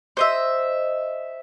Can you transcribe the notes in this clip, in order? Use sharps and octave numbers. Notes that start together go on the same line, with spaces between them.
C5 D#5 E5